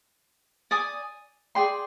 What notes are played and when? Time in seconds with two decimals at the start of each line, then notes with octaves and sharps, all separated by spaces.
0.71 D5 G#5 D#6
1.55 G#4 D5 G5 C6